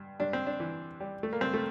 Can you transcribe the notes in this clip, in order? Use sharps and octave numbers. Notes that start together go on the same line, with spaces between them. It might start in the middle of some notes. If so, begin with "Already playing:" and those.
Already playing: G2
G2 D4
C4
D4
E3
G3
A3
A#3
G2 C4
A3